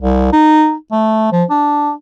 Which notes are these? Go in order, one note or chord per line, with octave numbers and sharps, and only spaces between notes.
C2
D#4
A3
F3
D4